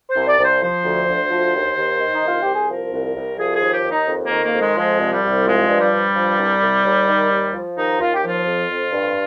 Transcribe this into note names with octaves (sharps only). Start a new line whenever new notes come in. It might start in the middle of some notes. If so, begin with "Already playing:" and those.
C5
C2
D5
C2
C5
F3 C5
D2
D2
F3
D#2
D#2
D#3
D#4
C2 F4
C2 G4
G#4
F3 A#4
C2
C2
F3 G#4
G#4
D#2
G4
D#2
D#4
F2
A#3
D#3
A#3
F2
G#3
F3 G#3
C2
G3
C2
F3 G#3
G2
G3
G2
F3
C2
C2
D#2
D#3
D#2
F3
D#2 D#4
D#2 F4
G4
F3 F4
F2
F2
G2